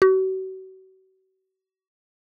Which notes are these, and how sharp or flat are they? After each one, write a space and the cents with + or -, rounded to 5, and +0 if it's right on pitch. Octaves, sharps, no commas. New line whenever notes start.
F#4 +40